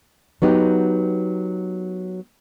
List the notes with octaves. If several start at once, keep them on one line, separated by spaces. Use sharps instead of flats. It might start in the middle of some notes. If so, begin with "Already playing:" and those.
F#3 B3 D#4 G4